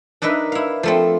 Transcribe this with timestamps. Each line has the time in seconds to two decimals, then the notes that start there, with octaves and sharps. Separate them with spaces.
0.22 D4 D#4 A#4 B4 E5
0.52 E4 F5
0.83 F3 A3 C4